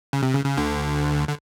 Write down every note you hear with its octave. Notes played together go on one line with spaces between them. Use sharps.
C#3
C3
C#3
C#3
D2 D3
D3